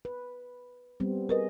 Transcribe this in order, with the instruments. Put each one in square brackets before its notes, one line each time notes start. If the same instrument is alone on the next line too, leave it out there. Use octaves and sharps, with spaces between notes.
[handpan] B4
G3 B3 C4
[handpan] G#4 D#5 [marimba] A#4 B4